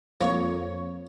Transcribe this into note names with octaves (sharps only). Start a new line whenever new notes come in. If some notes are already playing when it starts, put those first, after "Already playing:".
F2 F3 A#3 C#5 C#6